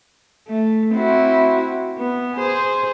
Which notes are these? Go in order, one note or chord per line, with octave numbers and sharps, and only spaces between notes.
A3
C4 E4 F#4
B3
G#4 C5